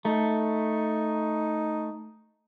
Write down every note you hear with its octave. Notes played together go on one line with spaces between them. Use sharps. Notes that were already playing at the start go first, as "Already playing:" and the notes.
A3 D#4